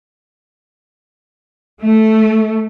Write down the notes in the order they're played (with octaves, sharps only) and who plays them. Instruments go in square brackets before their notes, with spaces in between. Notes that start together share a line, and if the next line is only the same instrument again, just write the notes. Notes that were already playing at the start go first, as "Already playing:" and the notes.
[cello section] A3